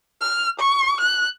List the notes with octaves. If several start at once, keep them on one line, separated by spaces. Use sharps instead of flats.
F6
C#6
F#6